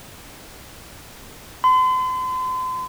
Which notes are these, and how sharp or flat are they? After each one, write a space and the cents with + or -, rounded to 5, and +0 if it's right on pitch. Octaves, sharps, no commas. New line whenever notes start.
C6 -40